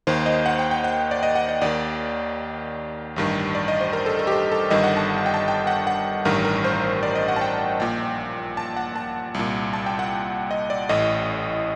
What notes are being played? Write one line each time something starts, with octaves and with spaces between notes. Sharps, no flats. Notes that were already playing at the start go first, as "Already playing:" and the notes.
D#2 D#3 C5
D#5
F#5
G5
G5
F#5
D5
D#5
F#5
D#5
D#2 D#3 D5
A1 G2 D#3
D5
D#5
C5
A#4
A4
A#4
G4
A4
A4
G1 G2 D#3 D#5
F#5
A5
A5
G5
A5
G5
F#5
F#5
A1 G2 D#3 A#4
A#4
C5
D5
D#5
F#5
A5
G5
A#1 A#2 G5
A5
F#5
A5
C2 A#2
A5
G5
F#5
D#5
D5
A1 A2 D#5